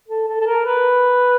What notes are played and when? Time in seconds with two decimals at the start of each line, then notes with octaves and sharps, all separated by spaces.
0.09 A4
0.28 A4
0.41 A4
0.46 A#4
0.65 B4